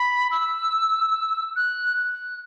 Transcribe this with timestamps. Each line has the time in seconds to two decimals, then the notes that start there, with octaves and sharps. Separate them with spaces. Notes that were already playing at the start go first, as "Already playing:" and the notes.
Already playing: B5
0.31 E6
1.56 F#6
1.97 F#6